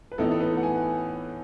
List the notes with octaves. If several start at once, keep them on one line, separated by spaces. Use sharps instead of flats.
B4
A2 E3 B3 D#4 A4
A4
B4
F#5
G#5